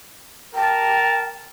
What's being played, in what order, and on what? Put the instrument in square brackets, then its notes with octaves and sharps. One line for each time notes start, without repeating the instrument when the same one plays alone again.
[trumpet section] A#4 A5 [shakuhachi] G5